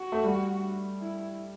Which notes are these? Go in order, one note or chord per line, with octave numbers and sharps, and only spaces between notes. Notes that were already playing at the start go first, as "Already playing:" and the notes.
Already playing: F#4
A3
G3
E4